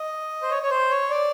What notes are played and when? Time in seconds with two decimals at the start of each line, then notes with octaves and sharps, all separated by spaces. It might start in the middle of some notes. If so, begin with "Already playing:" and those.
Already playing: D#5
0.42 C5
0.50 C#5
0.63 C#5
0.70 C5
0.91 C#5
1.10 D5